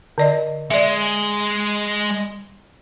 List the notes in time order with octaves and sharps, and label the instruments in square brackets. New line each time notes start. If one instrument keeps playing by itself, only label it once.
[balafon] D3 D5 D#5
[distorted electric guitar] G#3 [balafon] D5 E5